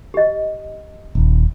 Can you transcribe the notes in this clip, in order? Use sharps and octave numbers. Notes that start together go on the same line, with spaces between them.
G4 D#5
D#1